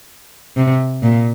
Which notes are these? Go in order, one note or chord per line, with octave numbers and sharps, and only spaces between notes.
C3
A#2